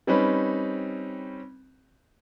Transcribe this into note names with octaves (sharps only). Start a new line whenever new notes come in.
G3 C4 C#4 D#4 B4